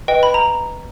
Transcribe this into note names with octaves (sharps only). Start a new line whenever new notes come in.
B4 D#5 G5
B5
A#5